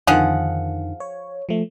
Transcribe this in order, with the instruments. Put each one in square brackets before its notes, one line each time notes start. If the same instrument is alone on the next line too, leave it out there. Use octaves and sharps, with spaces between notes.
[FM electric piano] F2 D3 D#3 [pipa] F3 G#4 F#5
[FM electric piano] C#5
F3 A3